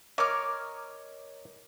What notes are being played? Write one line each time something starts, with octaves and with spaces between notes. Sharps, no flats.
A#4 C#5 D#5 D6 F6